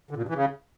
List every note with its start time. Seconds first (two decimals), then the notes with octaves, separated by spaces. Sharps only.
0.11 D3
0.17 A#2
0.23 G2
0.29 E3
0.34 C#3